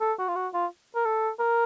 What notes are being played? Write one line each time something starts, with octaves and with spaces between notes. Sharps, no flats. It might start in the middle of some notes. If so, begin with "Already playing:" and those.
A4
F#4
F4
F#4
F4
A#4
A4
A#4